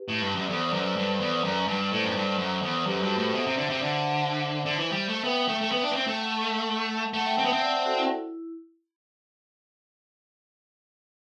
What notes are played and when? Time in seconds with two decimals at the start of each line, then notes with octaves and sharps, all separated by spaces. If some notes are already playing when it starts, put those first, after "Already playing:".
Already playing: G4 B4
0.08 A2
0.22 G2
0.35 F#2
0.40 D5
0.49 E2 A4 C5
0.61 A4 C5
0.72 F#2 B4 D5
0.96 G2 B4 D5
1.20 E2
1.44 F#2
1.68 G2
1.91 A2 A4 C5
2.04 F#2
2.16 G2
2.38 F#2
2.62 E2
2.86 F#2 G4 B4
3.02 G2 F#4 A4
3.18 A2 A4 C5
3.34 B2 C5 E5
3.46 C3
3.57 D3
3.70 C3
3.82 D3
4.66 D3
4.77 E3
4.92 G3
5.09 A3
5.24 B3 E5 G5
5.48 A3
5.61 A3
5.72 B3
5.83 D4
5.92 B3
5.96 C4
6.07 A3
6.19 F#5 A5
7.14 A3 F#5 A5
7.26 E5 G5
7.38 C4
7.45 B3
7.50 C4 C5 E5
7.62 D5 F#5
7.85 F#4 A4
7.97 E4